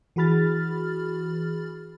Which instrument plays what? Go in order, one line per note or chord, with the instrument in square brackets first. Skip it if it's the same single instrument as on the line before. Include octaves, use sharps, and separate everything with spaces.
[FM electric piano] E3 F#4 G#4 B5 F6 A6